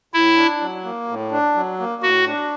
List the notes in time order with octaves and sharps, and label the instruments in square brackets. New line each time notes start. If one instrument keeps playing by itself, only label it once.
[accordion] A2 [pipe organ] E4
[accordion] D4
F#3
A#3
A2
D4
F#3
A#3
[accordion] A2 [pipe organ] F#4
[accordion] D4